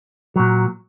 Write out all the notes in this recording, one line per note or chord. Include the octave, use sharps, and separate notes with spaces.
A#2 F#3